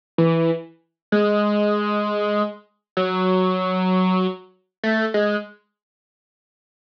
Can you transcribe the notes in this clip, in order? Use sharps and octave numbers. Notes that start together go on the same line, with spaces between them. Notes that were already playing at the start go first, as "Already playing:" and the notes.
E3
G#3
F#3
A3
G#3